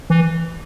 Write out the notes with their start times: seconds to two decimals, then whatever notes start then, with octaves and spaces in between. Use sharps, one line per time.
0.10 E3